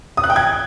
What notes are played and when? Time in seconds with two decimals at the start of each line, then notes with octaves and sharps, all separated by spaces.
0.17 D#6
0.24 F#6
0.30 G5
0.36 G#6